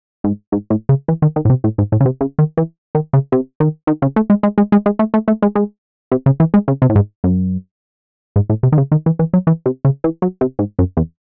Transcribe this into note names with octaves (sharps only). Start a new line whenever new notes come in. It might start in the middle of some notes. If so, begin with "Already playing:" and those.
G#2
G#2
A2
C#3
E3
D#3
D#3
A2
C3
A2
G#2
A2
C#3
C3
C#3
D#3
E3
D#3
C#3
C3
D#3
D#3
C#3
A3
G#3
G#3
G#3
G#3
G#3
A3
A3
A3
G#3
G#3
C3
C#3
E3
G#3
C#3
C3
A2
G#2
F#2
G#2
A2
C3
D#3
C#3
D#3
E3
E3
F#3
E3
C3
C#3
E3
F#3
C3
G#2
F#2
E2